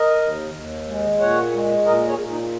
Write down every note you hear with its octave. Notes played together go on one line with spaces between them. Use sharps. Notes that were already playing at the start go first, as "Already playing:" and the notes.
Already playing: A#4 D#5
D#2
D#2
G#3
A#2 C#5 F#5
G#3
A#2 A#4 D#5
G#4 C#5
A#2
D#4